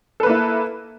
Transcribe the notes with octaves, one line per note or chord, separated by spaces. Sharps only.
A#3 E4 A4 B4